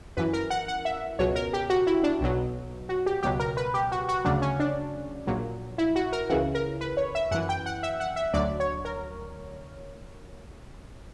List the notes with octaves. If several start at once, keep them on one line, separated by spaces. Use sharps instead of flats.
F#2 E3 B4
A#4
F#5
F#5
E5
C#2 B2 F#3 C#5
A#4
G4
F#4
E4
D4
B1 B2 F#3
F#4
G4
C#2 B2 F#3 G4
A#4
B4
G4
F#4
F#4
D2 C#3 F#3 D4
C#4
D4
A#1 A#2 F#3
E4
F#4
A#4
C#2 C#3 E3 F#4
A#4
B4
C#5
E5
F#2 E3 F#5
G5
F#5
E5
F#5
E5
D2 D3 F#3 D5
C#5
A#4